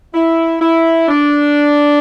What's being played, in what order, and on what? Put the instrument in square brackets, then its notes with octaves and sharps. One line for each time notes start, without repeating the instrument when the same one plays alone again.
[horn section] E4
E4
D4